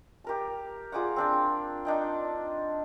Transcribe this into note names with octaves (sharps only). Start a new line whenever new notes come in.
G4 A#4 A5
F4 G#4 D5 F#5
C4 D4 G5
D4 D#4 G5